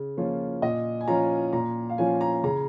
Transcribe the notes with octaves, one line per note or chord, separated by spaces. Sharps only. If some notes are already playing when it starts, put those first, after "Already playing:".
Already playing: C#3
F3 A#3 C#4 F4
A#2 D#5
G#5
F3 C#4 F4 A#5
A#2 A#5
F5
F3 C#4 F4 G#5
A#5
C#3 A#5